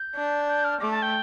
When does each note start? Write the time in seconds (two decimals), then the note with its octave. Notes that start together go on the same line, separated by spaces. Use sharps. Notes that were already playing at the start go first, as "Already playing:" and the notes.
Already playing: G6
0.15 D4
0.48 G6
0.64 F6
0.81 A3 D6
0.91 A5
1.02 G5